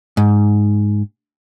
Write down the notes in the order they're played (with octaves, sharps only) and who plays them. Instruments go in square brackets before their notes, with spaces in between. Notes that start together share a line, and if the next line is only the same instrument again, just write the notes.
[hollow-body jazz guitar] G#2